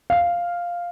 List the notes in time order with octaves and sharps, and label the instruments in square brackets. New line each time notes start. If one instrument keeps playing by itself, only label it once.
[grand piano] F5